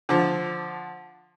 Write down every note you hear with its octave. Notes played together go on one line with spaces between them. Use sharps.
D3 F3